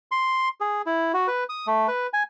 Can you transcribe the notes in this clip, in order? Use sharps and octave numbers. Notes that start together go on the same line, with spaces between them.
C6
G#4
E4
F#4
B4
D#6
A3
B4
G#5